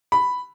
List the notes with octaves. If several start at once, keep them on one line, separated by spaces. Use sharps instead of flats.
B5